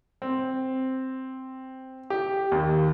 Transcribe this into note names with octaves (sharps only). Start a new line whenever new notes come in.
C4
G4
D#2